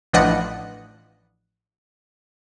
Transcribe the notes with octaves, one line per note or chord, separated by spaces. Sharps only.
A1 F3 D4 B4 D#5 F#5